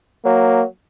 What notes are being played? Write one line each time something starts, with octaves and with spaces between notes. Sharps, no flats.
F#3 A#3